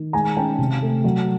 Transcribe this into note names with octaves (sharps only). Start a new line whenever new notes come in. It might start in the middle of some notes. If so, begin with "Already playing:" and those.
Already playing: D#3
G#3 G#5 A#5
C#4 G5 A5
C3
A3
F#3